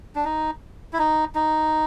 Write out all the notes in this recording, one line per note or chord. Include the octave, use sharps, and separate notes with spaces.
D4
D#4
E4
D#4
D#4